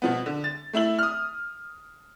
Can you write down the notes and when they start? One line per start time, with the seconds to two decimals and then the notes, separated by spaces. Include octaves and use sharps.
0.02 B2 F3 B3
0.26 D3
0.44 A6
0.73 A3 E4 E5 F#7
0.99 D#6 F6